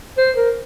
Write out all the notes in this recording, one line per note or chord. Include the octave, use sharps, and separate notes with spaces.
C5
A#4